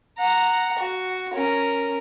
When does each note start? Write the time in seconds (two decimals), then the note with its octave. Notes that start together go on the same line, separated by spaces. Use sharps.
0.17 F#5 A#5
0.79 F#4
1.33 C#4 A#4